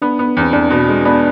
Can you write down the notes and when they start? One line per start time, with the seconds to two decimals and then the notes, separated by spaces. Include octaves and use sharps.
0.02 B3 D4
0.19 B3
0.37 E2 C4
0.53 E2 D4
0.70 B2
0.88 G#3
1.05 B3 D4